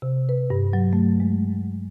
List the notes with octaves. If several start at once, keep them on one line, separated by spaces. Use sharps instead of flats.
C3
B4
G2
F#3
A3
G#3